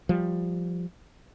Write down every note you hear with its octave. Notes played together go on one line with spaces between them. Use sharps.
F3 G3